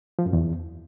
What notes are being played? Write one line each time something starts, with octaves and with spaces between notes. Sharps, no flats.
F3
F#2
E2